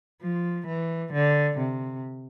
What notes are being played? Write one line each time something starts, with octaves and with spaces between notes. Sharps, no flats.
F3
E3
D3
C3